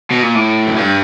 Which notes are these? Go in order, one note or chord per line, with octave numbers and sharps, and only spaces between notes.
B2
A#2
A2
F#2
G2